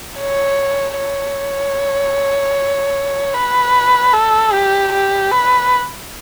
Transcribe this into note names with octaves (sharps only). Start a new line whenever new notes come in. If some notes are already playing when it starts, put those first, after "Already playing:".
C#5
C#5
B4
A4
G4
G4
B4